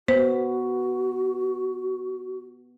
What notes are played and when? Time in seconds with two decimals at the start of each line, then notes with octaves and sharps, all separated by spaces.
0.08 B3 F#4 C5